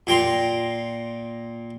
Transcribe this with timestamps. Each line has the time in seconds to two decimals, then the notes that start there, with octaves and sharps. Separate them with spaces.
0.07 A#2 G5 A#5 C6